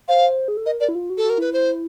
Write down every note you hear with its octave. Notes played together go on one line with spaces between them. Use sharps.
C5 F5
G#4
A4
A#4 D#5
A#4 D5
E4
F4
F#4
A4
F#4
A#4
E4 B4
C5